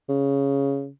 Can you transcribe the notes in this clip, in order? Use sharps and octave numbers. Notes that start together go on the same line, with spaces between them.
C#3